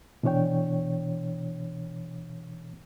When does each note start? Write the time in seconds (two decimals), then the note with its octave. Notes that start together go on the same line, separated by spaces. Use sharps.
0.23 B2 E3 D4 C#5 G5